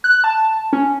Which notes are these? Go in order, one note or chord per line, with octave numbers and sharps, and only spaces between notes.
F#6
A5
C#4